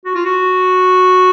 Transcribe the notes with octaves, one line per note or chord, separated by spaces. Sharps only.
F#4
F4
F#4